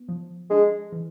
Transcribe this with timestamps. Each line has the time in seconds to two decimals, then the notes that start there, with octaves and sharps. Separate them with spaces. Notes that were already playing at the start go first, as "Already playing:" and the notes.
Already playing: B3
0.08 F3
0.50 G#3 D4
0.92 E3